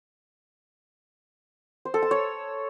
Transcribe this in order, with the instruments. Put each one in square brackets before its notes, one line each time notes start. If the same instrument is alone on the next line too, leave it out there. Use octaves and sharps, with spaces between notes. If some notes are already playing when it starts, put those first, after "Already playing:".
[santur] C5
A4
A5
C#5